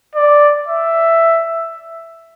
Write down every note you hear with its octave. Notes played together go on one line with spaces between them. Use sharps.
D5
E5